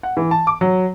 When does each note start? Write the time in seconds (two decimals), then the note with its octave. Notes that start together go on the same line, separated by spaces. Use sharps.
0.03 F#5
0.17 E3
0.31 A5
0.47 D6
0.61 F#3